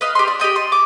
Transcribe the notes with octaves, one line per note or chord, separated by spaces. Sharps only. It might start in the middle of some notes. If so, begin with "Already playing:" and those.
B4 D#5 F5
G4 B5 C6
D4
G4 D5 D#5 G5
C6
D6